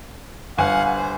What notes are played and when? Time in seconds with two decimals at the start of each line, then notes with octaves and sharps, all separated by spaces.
0.58 G1 F5 F#5 G#5
0.96 C5